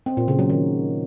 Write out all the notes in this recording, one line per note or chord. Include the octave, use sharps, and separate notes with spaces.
C4
A#2
C#3
F#3
D#3